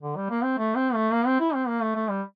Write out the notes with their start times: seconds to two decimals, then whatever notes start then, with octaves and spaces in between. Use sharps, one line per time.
0.02 D3
0.16 G3
0.30 A#3
0.43 C4
0.58 A3
0.75 C4
0.94 A3
1.12 A#3
1.26 C4
1.40 E4
1.55 C4
1.67 A#3
1.82 A3
1.95 A3
2.10 G3